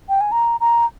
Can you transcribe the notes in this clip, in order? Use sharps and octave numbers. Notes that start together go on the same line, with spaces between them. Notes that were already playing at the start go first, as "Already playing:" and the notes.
G5
G#5
A#5
A#5